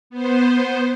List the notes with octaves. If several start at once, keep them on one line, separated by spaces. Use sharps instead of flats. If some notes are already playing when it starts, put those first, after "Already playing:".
B3 C5